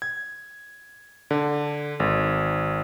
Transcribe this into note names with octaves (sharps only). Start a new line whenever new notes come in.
G#6
D3
G#1